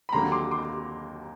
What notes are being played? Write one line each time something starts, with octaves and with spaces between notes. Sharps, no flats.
B5
D#2 D3 F#3 A#3 A#5 C6
C6 D6
C6 D6